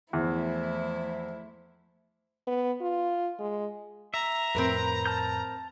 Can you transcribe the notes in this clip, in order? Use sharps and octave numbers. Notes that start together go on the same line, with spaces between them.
E2 F3 A3 E4
B3
F4
G#3
E5 A#5
F2 A2 C4 A#4 B4
A5 F6 G6